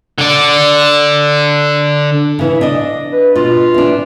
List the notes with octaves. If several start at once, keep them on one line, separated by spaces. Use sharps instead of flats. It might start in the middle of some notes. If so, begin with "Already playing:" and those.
D3 D5
C#3 E3
D4 D#5
B4
B2 F4
E3 D4